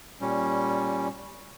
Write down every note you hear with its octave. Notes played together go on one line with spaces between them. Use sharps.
A#2 G3 C#4